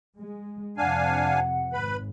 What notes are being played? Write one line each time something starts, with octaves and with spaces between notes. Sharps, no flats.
G#3
F2 C3 D4 F5 F#5 G#5
G#1 B4 B5